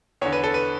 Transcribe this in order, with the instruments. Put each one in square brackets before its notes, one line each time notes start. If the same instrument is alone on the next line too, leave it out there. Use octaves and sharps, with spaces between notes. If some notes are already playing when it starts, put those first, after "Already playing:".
[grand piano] E2 D3 C#5
B4
A4
B4